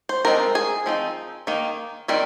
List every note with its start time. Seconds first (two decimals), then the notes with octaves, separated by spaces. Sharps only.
0.09 C5
0.25 F3 G#3 C4 D#4 A#4
0.55 G#4
0.86 F3 C4 D#4
1.47 D#3 A#3 D#4
2.08 D#3 G3 C4 D#4 A#4